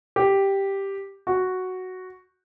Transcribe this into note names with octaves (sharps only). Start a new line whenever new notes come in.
G4
F#4